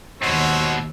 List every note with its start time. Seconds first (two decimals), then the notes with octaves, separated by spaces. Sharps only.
0.22 D#2 G#2 B2 F#4 C5 C#5 E6